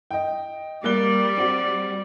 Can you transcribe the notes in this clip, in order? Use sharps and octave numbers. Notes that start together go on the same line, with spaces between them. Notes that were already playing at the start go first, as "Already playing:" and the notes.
D#5 G5
G3 A#3 D5 F#6 G7
C4 F#4